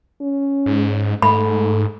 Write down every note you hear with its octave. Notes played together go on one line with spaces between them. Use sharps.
C#4
G#2
G#2 A3 B5